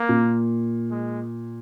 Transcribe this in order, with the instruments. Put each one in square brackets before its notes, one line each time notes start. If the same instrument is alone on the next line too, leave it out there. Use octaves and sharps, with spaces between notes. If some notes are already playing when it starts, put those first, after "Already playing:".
Already playing: [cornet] A#3
[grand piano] A#2
[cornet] G#3